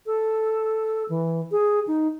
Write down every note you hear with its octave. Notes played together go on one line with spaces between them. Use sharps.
A4
E3
G#4
D#4